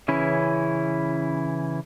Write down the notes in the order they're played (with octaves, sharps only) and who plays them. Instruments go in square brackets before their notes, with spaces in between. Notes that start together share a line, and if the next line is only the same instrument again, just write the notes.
[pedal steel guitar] C#3 E3 C#4 E4